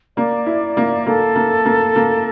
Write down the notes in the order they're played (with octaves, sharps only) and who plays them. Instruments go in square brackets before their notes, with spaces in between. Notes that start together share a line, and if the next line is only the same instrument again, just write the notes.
[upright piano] A#3 [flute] D5
[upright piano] E4
A#3
[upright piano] A#3 [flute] A4
[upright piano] A#3
A#3
A#3